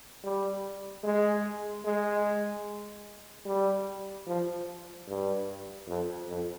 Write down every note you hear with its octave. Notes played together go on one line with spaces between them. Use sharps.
G3
G#3
G#3
G3
F3
G2
F2
F2